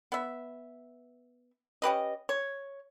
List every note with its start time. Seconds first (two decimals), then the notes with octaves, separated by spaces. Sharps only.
0.12 B3 E5
1.82 C#4 G4 B4 D#5
2.29 C#5